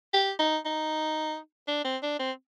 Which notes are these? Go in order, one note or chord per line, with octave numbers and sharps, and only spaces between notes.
G4
D#4
D#4
D4
C4
D4
C4